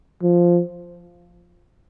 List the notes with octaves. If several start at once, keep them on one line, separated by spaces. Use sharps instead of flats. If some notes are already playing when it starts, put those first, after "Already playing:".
F3